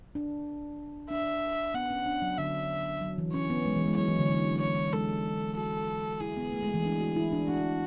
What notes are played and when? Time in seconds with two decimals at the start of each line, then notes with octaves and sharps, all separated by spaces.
0.15 D4
1.10 D4 E5
1.74 B3 F#5
1.91 C#4
2.06 D4
2.22 F#3
2.38 D3 E5
3.02 F#3
3.18 E3
3.34 C#4 C#5
3.50 B3
3.66 G#3
3.76 E3
3.87 G#3
3.97 F#3 C#5
4.08 E3
4.19 D3
4.30 F#3
4.61 C#5
4.93 G#3 A4
5.57 F#4 A4
6.21 E4 G#4
6.37 B3
6.53 A3
6.63 G#3
6.74 E3
6.85 D4
7.00 F#4
7.16 E4
7.32 D4
7.48 D4 F#4